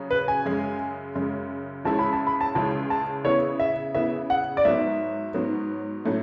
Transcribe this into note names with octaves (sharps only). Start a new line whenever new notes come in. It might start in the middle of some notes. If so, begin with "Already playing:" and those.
Already playing: C#3 F#3 C#4
B4
G#5
F#2 C#3 G#3
F#2 C#3 G#3
C#2 C#3 G#3 C#4 E4 A5
B5
A5
B5
A5
C#2 C#3 G#3 C#4 E4 A5
A5
C#3 E3 B3 E4 C#5
E5
C#3 E3 B3 E4 E5
F#5
D5
G#2 F#3 B3 E5
G#2 F#3 B3
A2 F#3 A3 C#4